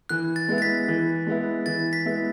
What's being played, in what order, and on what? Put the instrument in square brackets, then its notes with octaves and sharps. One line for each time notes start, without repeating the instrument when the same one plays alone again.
[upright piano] E3 [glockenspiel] F#6
[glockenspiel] A6
[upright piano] G#3 B3 E4
[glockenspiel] A6
B6
[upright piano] E3
G#3 B3 E4
[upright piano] E3 [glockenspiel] A6
[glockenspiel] B6
[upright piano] G#3 B3 E4